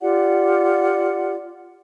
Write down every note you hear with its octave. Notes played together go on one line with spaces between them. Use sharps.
F4 G4 D5 F#5